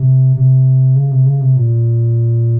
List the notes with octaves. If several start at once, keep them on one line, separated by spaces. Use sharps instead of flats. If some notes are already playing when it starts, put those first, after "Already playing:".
Already playing: C3
C3
C#3
C3
C#3
C3
A#2